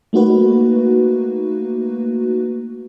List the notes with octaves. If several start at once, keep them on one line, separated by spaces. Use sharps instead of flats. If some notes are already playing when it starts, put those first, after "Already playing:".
A3 A#3 D#4 F#4 B4